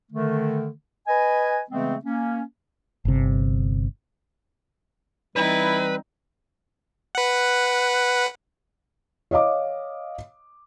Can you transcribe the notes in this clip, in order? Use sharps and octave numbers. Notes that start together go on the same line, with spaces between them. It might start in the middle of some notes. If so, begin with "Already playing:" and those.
D3 D#3 A3
B4 D#5 G#5
C#3 E3 G#3 A3 B3 C4
A#3 C#4
G1 C3
E3 G3 C4 D#4 E4 B4
B4 F#5
C#5 D#5 F5 D6